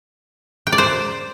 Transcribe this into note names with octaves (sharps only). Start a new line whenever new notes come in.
G5
D5
C5